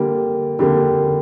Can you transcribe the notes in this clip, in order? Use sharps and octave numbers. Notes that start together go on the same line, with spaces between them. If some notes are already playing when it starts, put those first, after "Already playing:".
Already playing: D3 G3 A#3
D3 G3 A#3